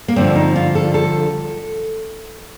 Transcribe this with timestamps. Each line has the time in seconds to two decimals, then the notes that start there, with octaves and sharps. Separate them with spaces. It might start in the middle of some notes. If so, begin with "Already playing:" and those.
0.08 A#3
0.16 G2 D3 F3 C4
0.36 D#4
0.56 F4
0.75 A4
0.94 A4